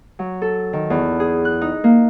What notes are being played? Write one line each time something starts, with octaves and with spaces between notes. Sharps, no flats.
F#3
A4
D#3
E2
G#4
F#6
D#4
A#3